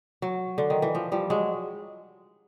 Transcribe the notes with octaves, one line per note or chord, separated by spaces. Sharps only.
F#3
D3
D#3
E3
F3
F3 G3
F#3 G#3